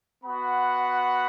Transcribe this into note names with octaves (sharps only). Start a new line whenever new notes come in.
B3 F#4 F#5 B5